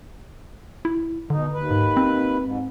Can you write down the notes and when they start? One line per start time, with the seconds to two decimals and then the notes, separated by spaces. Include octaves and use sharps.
0.85 E4
1.30 B2 D3 D#4
1.53 D#2 B4
1.71 G#2
1.97 C4
2.42 G#2